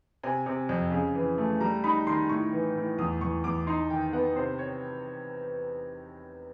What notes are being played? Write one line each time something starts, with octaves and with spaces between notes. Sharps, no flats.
C3 G#5
C3
F2
C#3
E3
A3
G3 A#5
D#4 B5
D#3 C6
A2 C#6
E3
A2
E2 D#6
E2 C#6
E2 D6
D#4 C6
D#3 G5
B3 F#5
C3 C5
C#5